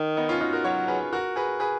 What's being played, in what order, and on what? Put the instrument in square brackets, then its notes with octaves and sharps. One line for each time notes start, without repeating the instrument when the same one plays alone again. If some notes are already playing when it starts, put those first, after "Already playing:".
Already playing: [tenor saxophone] D#3
[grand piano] B3 D#4
C#4 F4
D#4 F#4
F#4 A#4
[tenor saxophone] F#3 [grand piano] A#4 C#5
[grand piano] G#4 B4
F#4 A#4
G#4 B4
G#4 B4